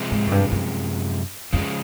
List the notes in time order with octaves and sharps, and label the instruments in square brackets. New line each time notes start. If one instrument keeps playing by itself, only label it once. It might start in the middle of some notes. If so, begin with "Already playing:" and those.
Already playing: [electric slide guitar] C3 F3 G#3
[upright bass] G#2
F#2
G2
F#2
[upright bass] F2 [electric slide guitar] C#3 F3 G#3